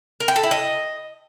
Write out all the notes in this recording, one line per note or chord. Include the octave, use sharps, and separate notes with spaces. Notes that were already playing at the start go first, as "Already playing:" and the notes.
A#4
G5
A4
E4
D#5